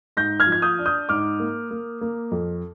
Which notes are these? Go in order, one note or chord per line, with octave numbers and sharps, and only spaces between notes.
G#2 G6 A#6
F6 G#6
F3
G#6
D#6 G6
D4
D#6 G6
G#2 D6 F6
A#3
A#3
A#3
F2